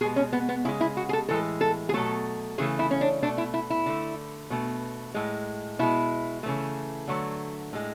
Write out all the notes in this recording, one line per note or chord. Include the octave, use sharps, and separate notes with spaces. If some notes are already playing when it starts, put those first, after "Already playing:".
B2 G#3 G#4
C#4
B3
B3
C#3 G#3 E4
E4
F#4
G#4
A4
A2 E3 G#3 A4
A4
G#4
B2 F#3 A3 A4
C#3 E3 A3 G#4
E4
C#4
D4
B2 A3 D4
E4
E4
E4
D3 A3
B2 A3
A2 G#3
B2 G#3 E4
C#3 E3 A3
D3 F#3 A3
A2 G#3